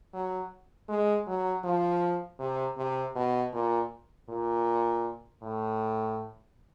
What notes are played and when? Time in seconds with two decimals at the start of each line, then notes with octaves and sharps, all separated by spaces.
0.14 F#3
0.89 G#3
1.27 F#3
1.64 F3
2.40 C3
2.77 C3
3.15 B2
3.53 A#2
4.29 A#2
5.42 A2